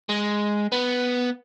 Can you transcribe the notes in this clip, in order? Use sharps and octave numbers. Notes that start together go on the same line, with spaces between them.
G#3
B3